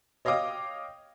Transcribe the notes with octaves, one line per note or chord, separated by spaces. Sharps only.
C#5 D#5 F5 G5 D6 D#6